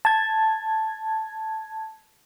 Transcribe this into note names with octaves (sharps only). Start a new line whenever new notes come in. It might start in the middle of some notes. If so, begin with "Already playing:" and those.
A5 G#6